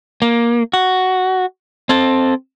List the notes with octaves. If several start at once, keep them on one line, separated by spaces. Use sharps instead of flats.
A#3
F#4
C4 A4